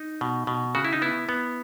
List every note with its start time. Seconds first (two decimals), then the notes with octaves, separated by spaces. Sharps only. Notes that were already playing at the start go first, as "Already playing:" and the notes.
Already playing: D#4
0.21 B2
0.47 B2
0.75 C#3 F#4
0.85 E4
0.93 D#4
1.02 B3 E4
1.29 B3